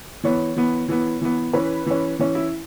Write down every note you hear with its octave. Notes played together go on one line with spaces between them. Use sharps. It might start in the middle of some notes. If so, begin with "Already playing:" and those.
E3 B3 C#5
E3 B3
E3 B3
E3 B3
E3 C#4 B4
E3 C#4
E3 C#4
E4